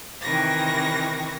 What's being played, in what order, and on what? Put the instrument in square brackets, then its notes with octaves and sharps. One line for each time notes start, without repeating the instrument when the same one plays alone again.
[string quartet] C3 D#3 E3 C#6 A#6